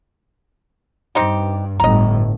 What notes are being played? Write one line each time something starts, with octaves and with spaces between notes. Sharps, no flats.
G2 C4 D#4 G4
G1 A2 D#5 A#5